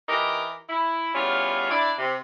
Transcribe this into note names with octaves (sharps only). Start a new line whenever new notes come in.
E3 D#4 G4 A#4
E4
E2 G3 C#4 F4
D4 E4 D5
C3